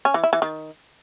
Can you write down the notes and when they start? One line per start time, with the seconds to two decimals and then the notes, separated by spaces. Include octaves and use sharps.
0.05 C#4
0.14 E3
0.24 E4
0.33 E3
0.42 D#3